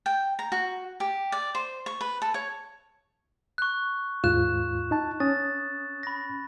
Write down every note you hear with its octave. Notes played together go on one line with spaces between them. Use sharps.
G5
A#5
F#4
G4
D5
C5
C#6
B4
A4
C#5
C#6 F#6
D#2 G#2 F4 F#6 E7
D#4 A5
C#4 D#6 A6
B5 A#6